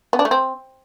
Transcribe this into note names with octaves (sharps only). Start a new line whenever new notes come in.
B3
D4
A3
C4